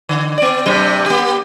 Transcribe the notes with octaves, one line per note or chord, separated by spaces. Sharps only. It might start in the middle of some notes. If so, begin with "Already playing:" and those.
D3
B3 D5
G2 C3 F#3
A#3 G4